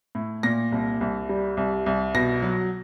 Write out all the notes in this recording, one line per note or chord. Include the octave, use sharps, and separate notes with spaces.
A2
A#2 A#6
C2
C2
G3
C2
C2
B2 A#6
F#3